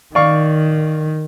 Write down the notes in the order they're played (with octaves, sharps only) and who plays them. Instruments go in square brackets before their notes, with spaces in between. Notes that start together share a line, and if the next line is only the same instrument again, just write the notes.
[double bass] D#3 [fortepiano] D5 F5 C#6